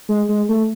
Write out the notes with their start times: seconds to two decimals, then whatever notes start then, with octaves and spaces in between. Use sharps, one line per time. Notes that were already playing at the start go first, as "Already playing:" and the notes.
0.09 G#3
0.29 G#3
0.49 A3